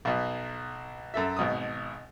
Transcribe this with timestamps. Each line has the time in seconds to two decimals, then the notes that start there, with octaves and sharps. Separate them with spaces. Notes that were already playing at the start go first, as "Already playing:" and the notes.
0.05 B1 B2
1.14 F#2 A4 E5
1.37 G#1 B2 D#6